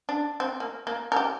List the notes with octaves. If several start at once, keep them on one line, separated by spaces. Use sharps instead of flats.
D4
C4
A#3
A#3
A#4
G4